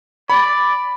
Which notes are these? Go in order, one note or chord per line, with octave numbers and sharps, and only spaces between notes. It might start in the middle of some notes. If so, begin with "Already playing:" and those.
D5 B5